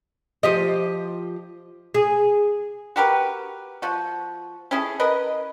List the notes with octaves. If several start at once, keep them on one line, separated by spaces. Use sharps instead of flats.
F3 G4 D#5
G#4
F#4 G4 A#4 B4
F3 F#4
C#4 E4 G#4 A4
A#4 B4 D#5